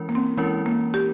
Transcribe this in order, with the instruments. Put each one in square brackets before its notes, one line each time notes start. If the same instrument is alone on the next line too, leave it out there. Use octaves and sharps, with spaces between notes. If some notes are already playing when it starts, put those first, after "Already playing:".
Already playing: [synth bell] E3 G#3 C#4 E4 A#4
[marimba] A#3
C4
[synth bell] E3 G#3 C#4 E4 A#4
[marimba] A#3
G4